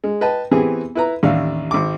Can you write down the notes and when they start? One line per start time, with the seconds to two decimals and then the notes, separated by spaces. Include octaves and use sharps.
0.04 G#3
0.21 B4 D#5 G5 A5
0.51 E3 B3 C4 G4 G#4
0.95 E4 B4 A#5
1.23 A1 D#2 D4 F5
1.71 G#1 D6